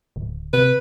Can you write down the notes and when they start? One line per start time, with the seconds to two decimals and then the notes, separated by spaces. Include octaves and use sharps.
0.16 D1
0.53 C3 B4